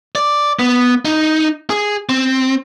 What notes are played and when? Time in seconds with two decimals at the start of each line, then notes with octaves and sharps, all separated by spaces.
0.15 D5
0.59 B3
1.05 D#4
1.70 G#4
2.09 C4